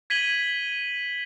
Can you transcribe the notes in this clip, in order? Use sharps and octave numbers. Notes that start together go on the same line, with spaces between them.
G#6 B6 D#7 F#7 G7